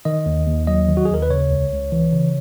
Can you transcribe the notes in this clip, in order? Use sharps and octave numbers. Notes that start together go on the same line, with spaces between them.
D#3 D#5
D#2
D#2
F#3 D#5
D#3
F#4
G#4
D#2 A#4
B4
C#3 C#5
C#2
C#2
E3
C#3